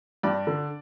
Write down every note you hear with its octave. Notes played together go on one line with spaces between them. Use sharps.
G2 D5
D3